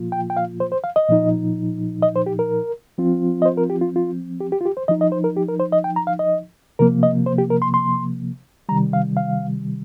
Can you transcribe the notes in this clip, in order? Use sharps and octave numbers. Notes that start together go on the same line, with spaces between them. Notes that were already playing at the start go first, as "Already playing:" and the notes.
Already playing: A#2 F3 A#3 F4
G5
G5
F5
C5
C5
F5
D#5
A#2 F3 D#4
D#5
C5
G4
A#4
F3 C4 F4
D#5
C5
A#4
G4
F4
F4
G4
G4
F4
G4
C5
F3 D#4 D#5
D#5
C5
A#4
G4
A#4
C5
D#5
G5
A#5
F5
D#5
C3 F3 A#3 A#4
D#5
C5
G4
A#4
C6
C6
C3 D#3 G3 A#5
F5
F5